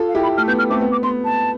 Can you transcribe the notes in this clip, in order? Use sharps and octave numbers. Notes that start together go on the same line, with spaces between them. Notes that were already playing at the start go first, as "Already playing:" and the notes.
Already playing: F4 A4
F5
E4 G4
B5
A3 F6
B3 G6
F6
A3 C4 D6
B3
D6
B3 C6
A5